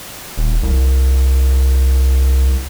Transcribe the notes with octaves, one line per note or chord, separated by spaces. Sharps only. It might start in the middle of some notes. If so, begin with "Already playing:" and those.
D#1
C2